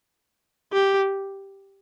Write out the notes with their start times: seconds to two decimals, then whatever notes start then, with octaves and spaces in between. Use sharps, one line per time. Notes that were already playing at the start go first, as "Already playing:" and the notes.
0.73 G4